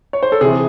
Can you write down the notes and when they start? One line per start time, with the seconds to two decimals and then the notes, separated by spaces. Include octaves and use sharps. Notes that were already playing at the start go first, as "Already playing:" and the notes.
0.13 C#5
0.23 C5
0.32 A4
0.41 C3 E3 G#4